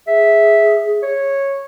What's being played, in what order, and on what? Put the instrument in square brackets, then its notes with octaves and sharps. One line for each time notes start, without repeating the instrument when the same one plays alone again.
[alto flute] G#4 [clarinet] E5
[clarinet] C#5